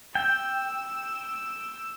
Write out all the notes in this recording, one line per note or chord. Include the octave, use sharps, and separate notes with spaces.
G5 E6